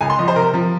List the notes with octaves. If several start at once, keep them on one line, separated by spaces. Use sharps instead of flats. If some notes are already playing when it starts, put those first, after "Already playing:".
C#2 G#5
C6
F3 D#5
C5
C3 A#4
F3